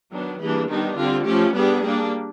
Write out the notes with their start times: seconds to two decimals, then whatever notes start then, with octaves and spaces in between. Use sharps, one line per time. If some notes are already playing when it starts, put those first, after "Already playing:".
0.11 D#3 F#3 B3 D4
0.40 E3 G3 A#3 D4 G#4
0.69 D#3 G3 B3 D4 D#4
0.97 D3 G3 C4 F4
1.25 F3 A3 C#4 G4
1.54 G3 B3 D4 G#4
1.83 G3 A#3 D4